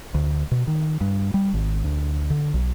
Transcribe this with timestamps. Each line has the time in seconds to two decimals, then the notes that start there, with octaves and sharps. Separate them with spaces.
0.15 D2
0.51 B2
0.67 D#3
1.01 G2
1.34 G3
1.54 G#1
1.84 D2
2.30 D3
2.54 B1